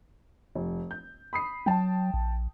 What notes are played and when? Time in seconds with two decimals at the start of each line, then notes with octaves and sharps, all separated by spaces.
0.55 F1
0.91 G6
1.33 B5 D#6 C7
1.66 F#3 G5 A5
2.14 A#1